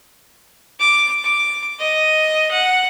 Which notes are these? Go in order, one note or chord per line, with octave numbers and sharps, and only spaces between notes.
D6
D6
D#5
F#5